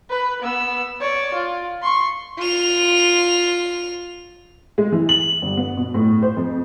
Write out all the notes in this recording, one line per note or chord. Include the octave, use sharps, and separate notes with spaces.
B4
B3 E6
C#5 D5
F4
C6 C#6
F4 F7
G#3
E3
F#7
G1
B3
B2
A2
C5
F2